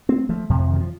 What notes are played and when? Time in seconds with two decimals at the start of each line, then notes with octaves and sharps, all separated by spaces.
0.09 A3 C4
0.29 F3 A3
0.50 F2 C3 F3
0.60 F3
0.70 D#3
0.76 F#3
0.80 F3